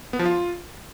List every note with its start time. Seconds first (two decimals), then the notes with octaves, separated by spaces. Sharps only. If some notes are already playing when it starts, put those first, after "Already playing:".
0.13 B3
0.19 F3
0.26 F4